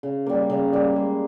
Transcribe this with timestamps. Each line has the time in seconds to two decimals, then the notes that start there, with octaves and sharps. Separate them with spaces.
0.03 C#3
0.26 G3 A#3
0.50 C#3
0.73 G3 A#3
0.96 G#3